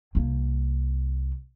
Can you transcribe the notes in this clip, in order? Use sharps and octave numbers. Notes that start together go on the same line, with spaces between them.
C2 A#3